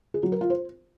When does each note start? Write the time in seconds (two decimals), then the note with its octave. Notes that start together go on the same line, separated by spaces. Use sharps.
0.14 G#4
0.23 F#3
0.32 A#4
0.41 F4
0.50 C5